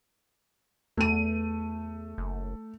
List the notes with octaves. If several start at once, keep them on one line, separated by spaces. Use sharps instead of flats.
E2 A3 D#7
F#1